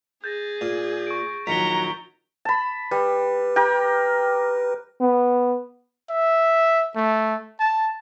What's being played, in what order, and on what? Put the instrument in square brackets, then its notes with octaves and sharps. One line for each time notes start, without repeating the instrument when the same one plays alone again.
[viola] G#4 [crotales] G6 A6 A#6
[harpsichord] A#2
[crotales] C#6 D7
[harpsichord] A#1 D#3 [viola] F#3 A#5 [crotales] B6 C#7 G7
[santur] A5 B5
[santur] G3 [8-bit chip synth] B4
[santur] G4 A#4 G5
[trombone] B3
[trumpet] E5
A3
A5